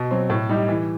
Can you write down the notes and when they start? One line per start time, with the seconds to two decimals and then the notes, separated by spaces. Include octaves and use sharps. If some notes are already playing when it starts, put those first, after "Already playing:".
Already playing: B2
0.11 F#3 C4
0.30 A2
0.49 G3 D#4 G4
0.68 E3